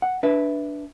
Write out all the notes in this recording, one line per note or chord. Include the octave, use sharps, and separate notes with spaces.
F#5
D4 B4 E5